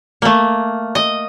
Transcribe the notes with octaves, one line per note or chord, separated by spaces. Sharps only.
A3 A#3
D#5